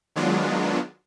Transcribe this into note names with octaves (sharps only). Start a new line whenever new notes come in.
D#3 F#3 G#3 B3 D4 F4